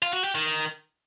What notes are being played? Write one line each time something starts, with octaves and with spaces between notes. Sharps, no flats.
F4
F#4
G4
D#3